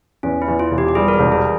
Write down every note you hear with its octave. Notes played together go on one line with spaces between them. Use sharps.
E2 C#4
E4
E2
F4
E1
G4
G4
G3 G#4
A#4
G#4
E1
G#4